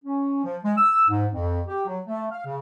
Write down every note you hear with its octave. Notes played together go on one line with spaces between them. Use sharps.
C#4
F3
G#3
E6
G#2
F2
G4
F#3
A3
F5
C#3